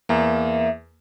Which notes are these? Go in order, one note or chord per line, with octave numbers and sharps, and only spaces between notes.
E2 A#3 E5